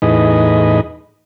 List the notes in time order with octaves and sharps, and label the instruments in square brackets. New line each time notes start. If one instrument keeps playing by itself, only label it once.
[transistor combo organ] E2 A2 D#4 G#4 B4 D#5